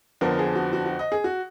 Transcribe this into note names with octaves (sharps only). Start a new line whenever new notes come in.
F2 D3 F3 B3 A#4
G#4
F#4
F#4
F#4
D#5
G#4
F#4